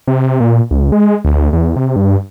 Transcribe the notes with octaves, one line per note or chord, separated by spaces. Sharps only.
C3
A#2
C#2
G#3
D2
E2
C3
G2